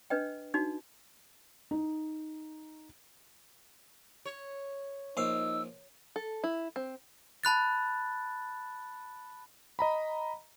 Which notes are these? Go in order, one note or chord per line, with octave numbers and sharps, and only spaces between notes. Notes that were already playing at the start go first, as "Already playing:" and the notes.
D4 B4 D#5 G5
D4 D#4 F#4
D#4
C#5
A#1 D#4 F5 E6
A4
E4
C4
A5 B5 F#6 A6
D#5 A#5 B5